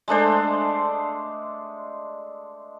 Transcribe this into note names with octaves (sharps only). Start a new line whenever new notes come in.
G#3 A3 D4 C5